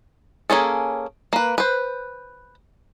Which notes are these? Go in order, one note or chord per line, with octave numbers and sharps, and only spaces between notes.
A#3 C#4 G#4 A4
A#3 B4
B4 C5